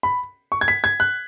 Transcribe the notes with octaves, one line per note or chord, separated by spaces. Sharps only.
B5
C#6
G#6
B6
G#6
F#6